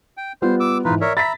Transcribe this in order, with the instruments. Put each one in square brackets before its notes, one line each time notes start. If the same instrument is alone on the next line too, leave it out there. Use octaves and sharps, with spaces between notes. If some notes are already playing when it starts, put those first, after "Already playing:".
[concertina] G5
[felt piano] G3 B3 F4 [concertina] C5
[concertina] D6 E6
[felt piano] G#2 E3 [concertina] D#4 F4 B4
[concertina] A#4 C#5 E5 [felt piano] D5
[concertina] E5 A#5 B5 [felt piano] A6 B6